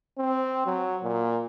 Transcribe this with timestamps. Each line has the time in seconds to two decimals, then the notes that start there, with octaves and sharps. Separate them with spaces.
0.18 C4
0.66 F#3
1.03 A#2